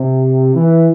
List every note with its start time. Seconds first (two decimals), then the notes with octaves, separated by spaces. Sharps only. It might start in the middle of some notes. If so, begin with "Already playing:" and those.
Already playing: C3
0.55 E3